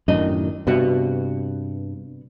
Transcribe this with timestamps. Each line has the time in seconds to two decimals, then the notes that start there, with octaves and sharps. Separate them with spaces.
0.08 F#2 A2 D#3 D4 D#5
0.67 G2 C3 B3 F#4